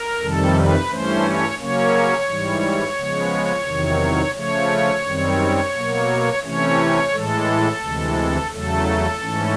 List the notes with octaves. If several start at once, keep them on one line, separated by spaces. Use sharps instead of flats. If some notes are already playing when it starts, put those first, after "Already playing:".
Already playing: A#4
F2 C3 D#3 G3 A4
B4
G2 E3 A3 C#4 C5
C#5
C#3 F#3 A#3 C#4 C#5
G#2 E3 G3
C#3 F3 G#3 B3
E2 C3 D#3 F#3
C#3 F3 A3 C#5
F#2 D#3 G3 C4
B2 F#3 A#3
C3 E3 A3 C#4 C#5
A2 E3 G#3 A4
D2 C3 E3 G#3
E2 C#3 F#3 A3 A4
G#2 E3 A3 C#4